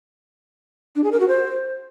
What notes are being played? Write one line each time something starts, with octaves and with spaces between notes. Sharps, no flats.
D4
G#4
A#4
F#4
C5